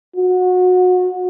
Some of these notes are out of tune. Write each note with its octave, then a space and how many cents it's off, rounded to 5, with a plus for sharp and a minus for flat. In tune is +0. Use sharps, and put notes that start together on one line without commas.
F#4 -25